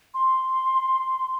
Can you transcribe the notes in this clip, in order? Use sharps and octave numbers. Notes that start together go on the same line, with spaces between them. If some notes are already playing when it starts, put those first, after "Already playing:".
C6